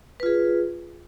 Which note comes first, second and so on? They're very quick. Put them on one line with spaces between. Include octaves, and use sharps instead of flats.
B4 F4 G#4